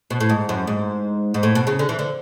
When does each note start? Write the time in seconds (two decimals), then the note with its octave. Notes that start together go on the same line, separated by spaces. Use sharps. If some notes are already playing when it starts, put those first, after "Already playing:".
0.10 B2
0.20 A2
0.29 G#2
0.49 F#2
0.67 G#2
1.34 G#2
1.43 A2
1.55 B2
1.67 C#3
1.79 D3
1.89 E3
1.99 D3